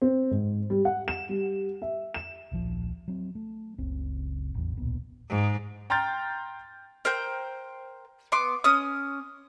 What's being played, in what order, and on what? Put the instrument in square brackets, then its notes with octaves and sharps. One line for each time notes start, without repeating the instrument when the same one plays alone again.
[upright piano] C4
G#2
G3
F#5
E7
G3
E5
E7
[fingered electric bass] D1 A#1 F3
F#3 C4
A3
F#1 C#2 C4
A1 E2
D1 B1 A#2 B3
[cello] G#2
[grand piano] G5 A#5 C6 F6 G6 A6
[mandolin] A#4 C5 G5 G6
B3 C6 D6
C#4 D#6